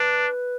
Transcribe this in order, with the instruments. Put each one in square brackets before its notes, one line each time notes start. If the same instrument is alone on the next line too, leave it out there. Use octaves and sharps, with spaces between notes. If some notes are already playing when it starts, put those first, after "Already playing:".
Already playing: [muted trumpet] D4 [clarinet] B4